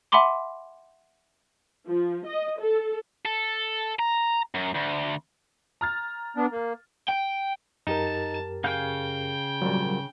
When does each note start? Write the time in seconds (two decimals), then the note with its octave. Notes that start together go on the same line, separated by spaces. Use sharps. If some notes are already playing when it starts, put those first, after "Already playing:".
0.12 E5 F#5 G#5 B5 C6 D6
1.87 F3
2.25 D#5
2.59 A4
3.26 A4
3.99 A#5
4.54 F#2
4.75 D2
5.81 A#5 F6 A6
6.37 B3 D4
6.51 A#3
7.08 G5
7.87 F#2 D#4 G4 A#4 A5
8.64 C#3 F5 G5 G#5 G6
9.62 G#1 A#2 F#3 G3